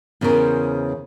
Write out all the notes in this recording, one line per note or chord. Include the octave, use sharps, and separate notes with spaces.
E2 C#3 B3 A#4 C5